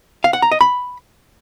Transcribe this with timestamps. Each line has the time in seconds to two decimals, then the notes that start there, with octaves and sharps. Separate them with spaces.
0.24 F5
0.33 F#5
0.42 A#5
0.51 D#5
0.61 B5